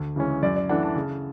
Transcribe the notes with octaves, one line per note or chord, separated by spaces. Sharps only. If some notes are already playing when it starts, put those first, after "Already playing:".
Already playing: D2
C#3 E3 G#3 C#4
F#2 D5
D5
E3 A3 D4 F#5
A5
C#3